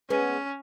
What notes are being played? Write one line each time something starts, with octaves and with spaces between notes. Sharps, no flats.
G#3 B3 C#4